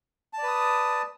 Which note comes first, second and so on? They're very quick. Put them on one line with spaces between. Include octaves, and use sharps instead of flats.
A5 D5 B4 D#6